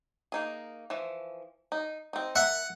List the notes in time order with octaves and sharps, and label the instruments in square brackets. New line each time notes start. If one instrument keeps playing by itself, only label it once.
[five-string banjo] A#3 D#4 G#4
E3 F3
D#4
C4 D#4
[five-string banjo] A#4 E5 [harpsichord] F#5